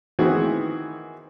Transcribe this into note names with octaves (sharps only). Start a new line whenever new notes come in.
D#3 E3 B3 C4 F#4 G#4